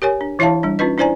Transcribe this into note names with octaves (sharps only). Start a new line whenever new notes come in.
G4 A#4 C#5 G#5
D4
E3 E4 C#5 E5 F5 A5
G3 D4
C#4 D#4 F4 B4 D#5
D4 E4 C5 D5 G#5 A#5